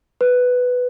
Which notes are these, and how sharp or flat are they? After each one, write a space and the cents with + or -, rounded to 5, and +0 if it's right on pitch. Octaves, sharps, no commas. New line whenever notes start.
B4 +5